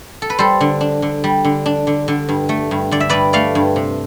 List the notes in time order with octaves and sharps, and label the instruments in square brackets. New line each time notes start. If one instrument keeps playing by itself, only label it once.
[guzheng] A4
B4
G3 A4 C5
D3
D4
D3
G3
D3
D4
D3
D3
G2
A3
G2
D3 D5
E5
G2 B4 D5
A3 D5 F5
G2
C3